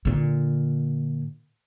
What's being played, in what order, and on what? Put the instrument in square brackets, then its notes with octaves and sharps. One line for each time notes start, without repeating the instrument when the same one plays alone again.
[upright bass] A#2 D3